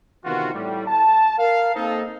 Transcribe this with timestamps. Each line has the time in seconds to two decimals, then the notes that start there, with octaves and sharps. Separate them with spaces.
0.25 C3 D#3 E3 B3 F4 F#4
0.54 A2 G3
0.87 A5
1.38 A#4 F5
1.75 A#3 C4 D#4 A4